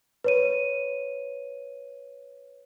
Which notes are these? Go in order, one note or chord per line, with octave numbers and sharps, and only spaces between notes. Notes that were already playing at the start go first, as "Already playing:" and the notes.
B4 C#5 D#7